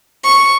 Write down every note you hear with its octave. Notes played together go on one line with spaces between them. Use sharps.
C#6